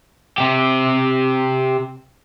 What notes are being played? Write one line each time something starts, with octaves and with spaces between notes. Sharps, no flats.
C3 G4